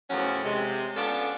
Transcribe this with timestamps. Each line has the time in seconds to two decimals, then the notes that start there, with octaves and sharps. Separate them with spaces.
0.10 E2 A2 F3 F#3 C#4
0.43 C3 G#3
0.95 B3 C#4 D4 F4 A4